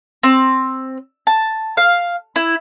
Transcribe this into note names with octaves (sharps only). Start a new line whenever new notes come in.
C4
A5
F5
E4